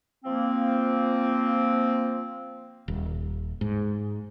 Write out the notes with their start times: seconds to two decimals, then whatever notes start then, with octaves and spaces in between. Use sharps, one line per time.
0.24 F3 A#3 C4
2.88 D#1
3.61 G#2